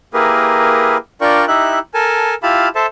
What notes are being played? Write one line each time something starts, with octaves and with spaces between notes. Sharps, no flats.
A#3 E4 G4 G#4 A#4 B4
D4 F4 A#4 D5 G5 C#6
D#4 E4 G4 E5 F#6
A4 A#4 G#5 A5
E4 F4 G4 F5 A5 B5
A4 C5 E5 A5